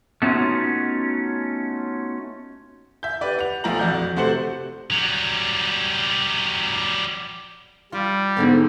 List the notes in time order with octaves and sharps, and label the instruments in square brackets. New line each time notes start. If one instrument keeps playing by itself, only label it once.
[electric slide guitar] A3 B3 C#4 D#4 F4 F#4
[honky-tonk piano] E5 G6
G4 B4 D5
F#5 F7
B1 F3 A3 A#5 F#7
F2 F#4 D5 F#5 G6
C3 A3 F#4 C5 C#7 F#7
[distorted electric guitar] F#3 G3
[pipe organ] G3 [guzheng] F4
[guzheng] G#2 D3 C4 [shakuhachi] B3